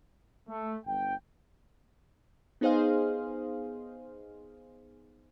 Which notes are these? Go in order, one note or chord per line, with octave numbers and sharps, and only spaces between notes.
A3
G1 G5
B3 D#4 G#4 C5 D#5 F5